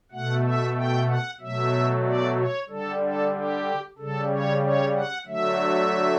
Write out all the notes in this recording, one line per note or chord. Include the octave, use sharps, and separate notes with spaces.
B2 A3 F#5
E5
G5
F#5
B2 F#3 A3 E5
D5
C#5
D3 G3 A4
A4
G4
C#3 G3 A4
C#5
C#5
F#5
D3 F#3 A3 E5